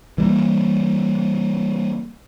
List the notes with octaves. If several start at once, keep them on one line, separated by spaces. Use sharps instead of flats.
E3 G3 A#3